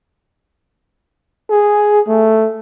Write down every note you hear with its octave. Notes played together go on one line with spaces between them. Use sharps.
G#4
A3